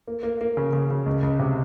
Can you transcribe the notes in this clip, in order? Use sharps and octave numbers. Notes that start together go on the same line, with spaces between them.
A#3
A#3
A#3
C#3
C#3
C#3
C#2
C#2
C3